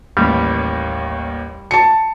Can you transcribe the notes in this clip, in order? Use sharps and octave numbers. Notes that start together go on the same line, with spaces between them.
A1 D#2 G3
A5 C#7